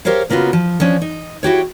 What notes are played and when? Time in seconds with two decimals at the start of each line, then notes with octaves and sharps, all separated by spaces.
0.05 G4 A#4 C5 C#5 F5
0.30 C#3 A#3 B3 F4 F#4
0.53 F3
0.80 F3 C#4 D4
1.02 D#4
1.43 E4 F#4 G4 C#5